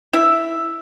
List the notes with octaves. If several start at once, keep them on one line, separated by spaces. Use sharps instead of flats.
E4 E5